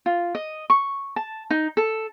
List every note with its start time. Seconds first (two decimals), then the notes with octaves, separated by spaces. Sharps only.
0.06 F4
0.35 D#5
0.70 C#6
1.16 A5
1.50 D#4
1.77 A4